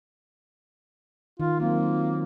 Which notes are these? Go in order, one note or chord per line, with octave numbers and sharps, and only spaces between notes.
D#3 F4
F#3 A#3 C4 F4